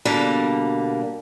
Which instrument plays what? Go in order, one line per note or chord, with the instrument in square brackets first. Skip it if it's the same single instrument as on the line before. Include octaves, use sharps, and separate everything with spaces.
[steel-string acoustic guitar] B2 D3 G3 A#3